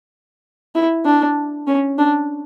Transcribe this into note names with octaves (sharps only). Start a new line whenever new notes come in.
E4
D4
C#4
D4